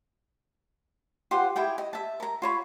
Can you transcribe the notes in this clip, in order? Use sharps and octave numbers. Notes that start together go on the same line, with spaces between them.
F4 G4 C5 F#5
E4 G4 G#4 G5
D#5
E5 A5
A#4 A#5
F4 C#5 B5